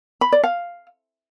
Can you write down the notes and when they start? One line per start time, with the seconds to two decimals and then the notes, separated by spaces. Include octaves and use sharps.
0.21 B5
0.32 D5
0.43 F5